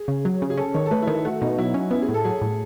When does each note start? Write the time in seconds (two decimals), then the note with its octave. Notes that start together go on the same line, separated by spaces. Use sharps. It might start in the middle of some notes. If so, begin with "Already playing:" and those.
Already playing: G#4
0.08 C#3
0.25 F#3
0.42 C#3
0.50 G#4
0.58 C#4 A4
0.74 D#3 C#5
0.86 A4
0.91 A3 B4
1.02 E4
1.07 D#3
1.14 E4
1.25 A3 F#4
1.41 B2 D#4
1.58 F#3 E4
1.74 C#4
1.91 B3 E4
2.02 G#4
2.09 A2
2.14 A4
2.24 F#3 G#4
2.41 A2